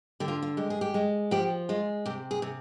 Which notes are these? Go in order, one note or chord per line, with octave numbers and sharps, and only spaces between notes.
D3 G4
F4
F4
G#3 G4
G#4
G4
G#3
F3 G4
G#3 F4
C3 G4
G#4
C3